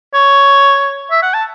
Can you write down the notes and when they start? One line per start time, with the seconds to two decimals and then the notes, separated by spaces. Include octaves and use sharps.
0.15 C#5
1.11 E5
1.22 F#5
1.34 A5